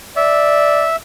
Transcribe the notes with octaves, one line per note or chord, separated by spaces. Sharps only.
D5 E5